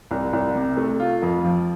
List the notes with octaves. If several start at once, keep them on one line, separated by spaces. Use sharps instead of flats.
C2
C2
C3
A3
F4
F2
F3